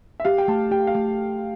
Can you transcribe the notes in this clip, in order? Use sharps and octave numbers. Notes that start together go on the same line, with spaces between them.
E5
G4 F5
G5
A3 A5
G4 G5
F5
A3